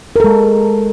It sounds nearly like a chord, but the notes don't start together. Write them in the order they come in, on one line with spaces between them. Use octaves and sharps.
A#4 A4 G#3